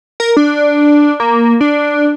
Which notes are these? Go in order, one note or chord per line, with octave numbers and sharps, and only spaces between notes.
A#4
D4
A#3
D4